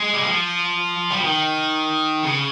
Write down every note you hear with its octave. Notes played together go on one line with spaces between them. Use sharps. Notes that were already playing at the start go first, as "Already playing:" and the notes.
Already playing: G#3
G3
F3
G3
F3
D#3
C#3